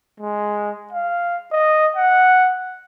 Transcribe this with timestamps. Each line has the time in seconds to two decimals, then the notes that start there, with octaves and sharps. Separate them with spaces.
0.21 G#3
0.93 F5
1.52 D#5
1.97 F#5